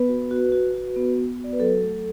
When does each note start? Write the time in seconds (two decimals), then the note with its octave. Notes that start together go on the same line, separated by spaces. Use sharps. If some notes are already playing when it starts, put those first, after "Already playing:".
Already playing: B3 B4
0.09 F#4
0.31 F#4
0.52 F#4
0.74 F#4
0.96 B3
1.18 B3
1.39 F#4
1.44 D5
1.53 B4
1.60 F#3 A4
1.82 A3